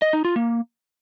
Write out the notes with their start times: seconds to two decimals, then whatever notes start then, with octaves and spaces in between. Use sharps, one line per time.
0.02 D#5
0.13 D#4
0.25 F4
0.36 A#3